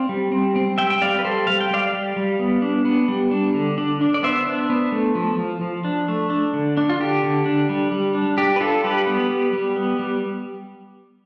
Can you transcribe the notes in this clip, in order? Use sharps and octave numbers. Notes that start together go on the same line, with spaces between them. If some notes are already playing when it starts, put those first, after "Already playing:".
Already playing: C4 D5 F5
G3
C4
C4
G3 E5 G5
G5
G3 D5 F5
B4
G3 A4 C5
G3 F5
G5
G3 D5 F5
G3
G3
B3
D4
B3
G3
D4
D3
D4
D4
D5
B3 C5 E5
D4
B3
A3
F3
F3
F3
D4
A3
D4
D3
D4
F4
D3 G4
D3
D4
G3
G3
D4
D4 G4
B4
D4 F4 A4
G3 G4 B4
B3
G3
G3
B3
G3